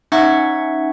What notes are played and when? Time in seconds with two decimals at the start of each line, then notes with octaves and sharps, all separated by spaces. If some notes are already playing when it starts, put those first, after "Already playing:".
0.12 C#4 D#4 E5 F#5 C#6 G#6